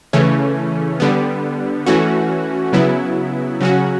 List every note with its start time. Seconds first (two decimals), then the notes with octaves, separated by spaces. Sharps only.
0.13 C#3 E3 A3 C#4
1.00 D3 G3 B3
1.86 E3 A3 C#4 F#4
2.73 C#3 F#3 B3 E4
3.61 C#3 F#3 C#4 F#4